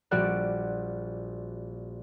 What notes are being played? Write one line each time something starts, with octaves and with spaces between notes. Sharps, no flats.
A#1 G3 F#4 G4 D5 F#6